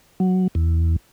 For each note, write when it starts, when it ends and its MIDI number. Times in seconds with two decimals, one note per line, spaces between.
0.20 0.47 54
0.55 0.96 40